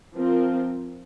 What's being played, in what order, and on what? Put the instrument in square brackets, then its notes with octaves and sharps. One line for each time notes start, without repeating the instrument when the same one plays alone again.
[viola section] F3 C4 F4 A#4